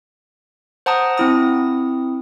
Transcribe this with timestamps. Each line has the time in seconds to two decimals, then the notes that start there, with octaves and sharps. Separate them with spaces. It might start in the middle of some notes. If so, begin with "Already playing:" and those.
0.86 C5 F#5 A5 A#5 D#6
1.18 C4 E4 D#6